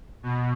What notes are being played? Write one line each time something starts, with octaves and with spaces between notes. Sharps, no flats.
B2